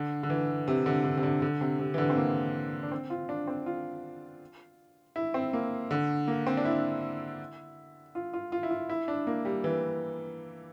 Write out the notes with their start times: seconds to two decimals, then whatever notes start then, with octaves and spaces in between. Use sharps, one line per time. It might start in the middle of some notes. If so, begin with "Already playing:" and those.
Already playing: D3
0.23 D3
0.30 E3
0.68 C3
0.86 D3
1.05 D3
1.17 C3
1.23 D3
1.42 D3
1.61 C3
1.80 C3
1.94 E3
1.98 D3
2.10 C4
2.17 A#3
2.83 D4
2.92 C4
3.10 F4
3.29 D4
3.47 C4
3.66 F4
5.16 E4
5.34 C4
5.53 A#3
5.91 D3
6.28 A#3
6.47 C4
6.57 D4
6.65 E4
8.15 F4
8.33 F4
8.52 F4
8.63 E4
8.71 F4
8.89 E4
9.08 D4
9.27 A#3
9.45 G3
9.64 E3